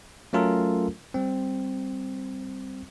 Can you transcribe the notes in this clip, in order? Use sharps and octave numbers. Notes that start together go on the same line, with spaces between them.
F#3 A3 C#4 F4 A4 A#4
G3 C4